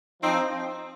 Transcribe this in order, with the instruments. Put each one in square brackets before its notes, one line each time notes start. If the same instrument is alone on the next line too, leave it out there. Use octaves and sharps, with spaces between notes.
[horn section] F3 C4 D#4